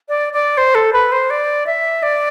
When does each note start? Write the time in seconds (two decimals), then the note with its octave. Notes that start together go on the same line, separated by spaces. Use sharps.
0.09 D5
0.33 D5
0.57 C5
0.75 A4
0.93 B4
1.12 C5
1.30 D5
1.66 E5
2.03 D5